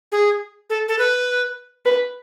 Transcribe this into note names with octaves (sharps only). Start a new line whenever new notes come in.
G#4
A4
A4
B4
B4